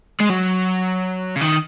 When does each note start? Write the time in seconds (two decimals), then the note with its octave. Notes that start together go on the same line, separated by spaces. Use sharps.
0.20 G#3
0.29 F#3
1.36 C#3
1.41 D#3